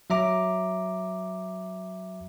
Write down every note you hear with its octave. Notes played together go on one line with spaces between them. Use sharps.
F#3 E5 A#5 D6